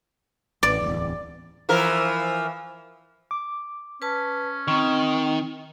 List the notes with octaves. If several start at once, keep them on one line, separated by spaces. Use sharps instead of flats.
A1 D5
D1 G1 E2
E3 F3 A#4
D6
C#4 B4 A5
D#3 C4 C#6